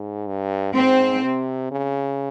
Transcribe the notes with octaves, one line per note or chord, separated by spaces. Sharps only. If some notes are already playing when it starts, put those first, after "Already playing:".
Already playing: G#2
G2
G#2 C4
C3
C#3